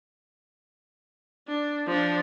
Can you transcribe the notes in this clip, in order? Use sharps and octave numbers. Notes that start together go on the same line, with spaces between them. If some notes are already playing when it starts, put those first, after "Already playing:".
D4
F3 D4